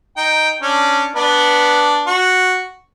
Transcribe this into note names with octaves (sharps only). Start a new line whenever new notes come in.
D#4 G5
C#4 D4
B3 D4
F#4